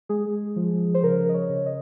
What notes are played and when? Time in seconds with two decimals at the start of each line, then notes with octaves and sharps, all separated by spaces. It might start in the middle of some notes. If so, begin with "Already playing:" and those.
0.09 G#3 G#4
0.56 F3
0.94 C5
1.03 C#3 A#4
1.29 D#5
1.34 C#5
1.49 C#3
1.66 D#5